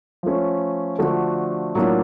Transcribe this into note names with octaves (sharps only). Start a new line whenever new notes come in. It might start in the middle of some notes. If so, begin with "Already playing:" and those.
F3 A3 C#4
D3 F3 A3 D4 F#4
A2 F#3 A#3 D4 F4